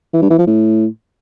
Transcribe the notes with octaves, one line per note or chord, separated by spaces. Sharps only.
E3
G2
E3
F3
A2